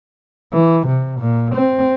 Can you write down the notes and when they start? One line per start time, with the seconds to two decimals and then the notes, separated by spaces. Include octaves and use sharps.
0.53 E3
0.87 C3
1.20 A#2
1.55 C4